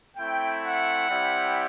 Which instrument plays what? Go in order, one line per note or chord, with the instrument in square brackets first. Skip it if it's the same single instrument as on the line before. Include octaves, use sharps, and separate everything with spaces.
[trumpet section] A3 C4 E4 G5
F#5
G3 C4 E4 G4